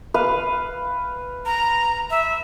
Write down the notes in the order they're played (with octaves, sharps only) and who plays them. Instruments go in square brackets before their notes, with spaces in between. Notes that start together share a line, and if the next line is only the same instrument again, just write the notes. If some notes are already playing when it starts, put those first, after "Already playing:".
[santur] B4 F5
[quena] A#5
E5